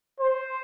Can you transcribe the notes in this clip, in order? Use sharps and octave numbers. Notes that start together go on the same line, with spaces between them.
C5